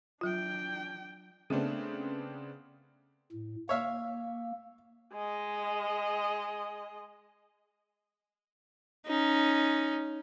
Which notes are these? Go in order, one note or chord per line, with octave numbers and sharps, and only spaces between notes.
F#3 D4 F4 G5
C#3 A3 B3 C4 D4
A2
A#3 C#5 E5 F5
G#3 D#5
C#4 D#4